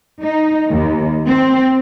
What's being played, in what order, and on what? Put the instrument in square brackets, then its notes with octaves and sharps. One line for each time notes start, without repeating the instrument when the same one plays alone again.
[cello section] D#4
D#2
C4